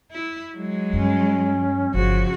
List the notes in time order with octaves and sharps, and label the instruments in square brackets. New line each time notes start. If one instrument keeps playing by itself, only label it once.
[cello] E4
F#3 G#3
[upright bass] G2 [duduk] C#4
[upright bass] G1 [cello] C#3 F#4 [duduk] F3